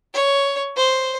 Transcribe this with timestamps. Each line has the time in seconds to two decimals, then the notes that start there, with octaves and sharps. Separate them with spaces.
0.14 C#5
0.77 C5